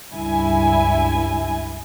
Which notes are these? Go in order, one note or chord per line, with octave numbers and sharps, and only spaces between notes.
C#2 G2 E4 G#5